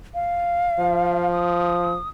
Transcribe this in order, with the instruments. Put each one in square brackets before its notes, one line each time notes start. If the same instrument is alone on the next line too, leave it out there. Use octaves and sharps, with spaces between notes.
[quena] F5
[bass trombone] F3
[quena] D#6